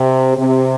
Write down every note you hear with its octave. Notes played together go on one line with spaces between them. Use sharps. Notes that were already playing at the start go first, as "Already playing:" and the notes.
Already playing: C3
C3